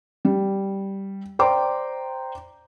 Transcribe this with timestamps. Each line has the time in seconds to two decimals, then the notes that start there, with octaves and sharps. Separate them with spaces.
0.25 G3
1.39 C5 D5 G5 A#5 C6 D6